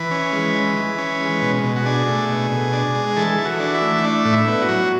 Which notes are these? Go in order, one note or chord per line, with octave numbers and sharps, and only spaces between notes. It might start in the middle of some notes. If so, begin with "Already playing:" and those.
Already playing: E3 B4
C#4
G#3
E3
E3
C#4
G#3
B2
B2
F#4
D4 G#4
A3
B2
B2
D4
G#3
E3 A4
E3
F#4
D4
E4
A3
D4
A2
E4
B3
F#4
F#3